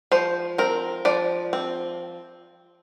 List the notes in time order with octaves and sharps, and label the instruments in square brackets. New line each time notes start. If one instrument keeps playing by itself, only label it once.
[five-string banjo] F3 C5
C4 A#4
F3 D5
C4